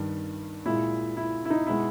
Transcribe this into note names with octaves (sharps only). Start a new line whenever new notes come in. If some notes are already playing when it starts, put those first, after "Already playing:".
Already playing: G2 D#3 G3
A#2 G#3 E4
E4
E4
D#4
B2 G#3 E4